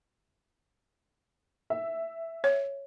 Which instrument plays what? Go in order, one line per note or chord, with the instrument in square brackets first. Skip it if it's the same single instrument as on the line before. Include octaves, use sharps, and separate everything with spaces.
[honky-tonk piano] E5
[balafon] C#5